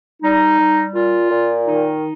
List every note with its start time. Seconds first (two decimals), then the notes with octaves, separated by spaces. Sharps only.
0.23 G3 D#4
0.59 G3
0.94 A#2 F4
1.30 A#2
1.66 D#3 D#4